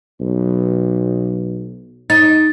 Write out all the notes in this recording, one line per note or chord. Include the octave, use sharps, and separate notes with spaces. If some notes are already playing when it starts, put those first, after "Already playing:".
B1
D#4 A6